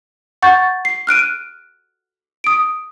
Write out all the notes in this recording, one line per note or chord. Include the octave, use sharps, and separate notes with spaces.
F#5 C#6 G6 A6
C7
F6 F#6 D7 D#7
D#6 D7